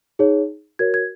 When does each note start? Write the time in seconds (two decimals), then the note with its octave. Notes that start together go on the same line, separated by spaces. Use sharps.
0.19 D#4 G#4 C#5
0.79 F#4 A#4 C#5 G#6
0.94 G#6